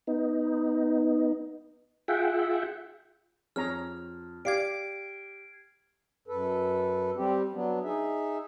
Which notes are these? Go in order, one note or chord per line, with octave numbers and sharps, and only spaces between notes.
B3 D#4
F4 G#4 E5 F#5 G5
F2 G#4 C#5 A#5 F6
G4 D5 F5 D6 G#6 C7 D7
F#2 A4 B4
G3 C4 G4
F#3 B3 D4
D#4 G#4 E5